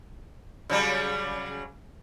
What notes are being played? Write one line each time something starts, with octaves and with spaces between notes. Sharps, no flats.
C#3 F#3 G3